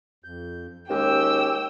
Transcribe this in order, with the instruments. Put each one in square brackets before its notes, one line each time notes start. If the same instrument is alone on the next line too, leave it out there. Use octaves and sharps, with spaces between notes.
[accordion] F2 G6
[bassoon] D#2 [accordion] G#3 C#4 G4 [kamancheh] G5 E6